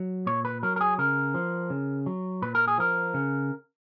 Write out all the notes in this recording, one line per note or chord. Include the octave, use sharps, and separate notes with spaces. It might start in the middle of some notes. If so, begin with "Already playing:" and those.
Already playing: F#3
A#2 C#5
B4
F#3 A#4
A#4
G#4
C#3 A#4
F3
C#3
F#3
A#2 B4
A#4
G#4
F3 A#4
C#3